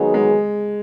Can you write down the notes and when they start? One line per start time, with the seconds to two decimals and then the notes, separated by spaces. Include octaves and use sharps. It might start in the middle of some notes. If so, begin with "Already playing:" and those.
Already playing: D#3 F#3 G#3 B3 D#4 G#4
0.14 G#3